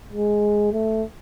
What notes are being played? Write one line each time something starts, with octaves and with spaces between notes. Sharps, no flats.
G#3
A3